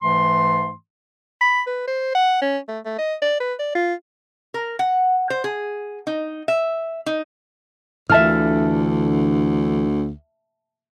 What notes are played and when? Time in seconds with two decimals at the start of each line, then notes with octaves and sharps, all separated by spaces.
0.02 G#2 E3 A3 C6
1.41 B5
1.67 B4
1.88 C5
2.15 F#5
2.42 C#4
2.68 A3
2.85 A3
2.99 D#5
3.22 D5
3.41 B4
3.59 D5
3.75 F4
4.54 A#4
4.79 F#5
5.30 C5
5.44 G#4
6.07 D#4
6.48 E5
7.06 D#4
8.09 D2 D3 E3 F4 E5 A5 F6